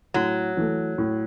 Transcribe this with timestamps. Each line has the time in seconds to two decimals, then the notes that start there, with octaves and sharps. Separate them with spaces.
0.14 A2 F#3
0.57 E3 A3
0.98 A2